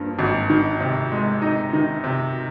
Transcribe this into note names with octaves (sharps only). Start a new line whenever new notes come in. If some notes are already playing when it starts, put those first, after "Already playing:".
Already playing: G2 F3 A#3
G#1
D#3
C3
G#3
D#4
D#3
C3